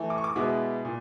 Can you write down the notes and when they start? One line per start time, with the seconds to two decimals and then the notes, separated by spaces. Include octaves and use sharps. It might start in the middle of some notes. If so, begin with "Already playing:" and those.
Already playing: E3 A3
0.10 D6
0.18 C#6
0.24 D6
0.36 B2 G#3 B3 E4
0.85 A#2